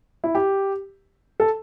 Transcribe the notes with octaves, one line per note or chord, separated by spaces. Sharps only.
E4
G4
A4